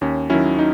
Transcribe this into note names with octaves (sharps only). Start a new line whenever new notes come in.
D#2 C#4
D#3 F#3 C#4 E4
D#4